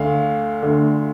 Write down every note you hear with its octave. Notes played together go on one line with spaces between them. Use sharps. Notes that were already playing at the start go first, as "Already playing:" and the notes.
Already playing: D2 D3 A3 F5
D2 D3 A3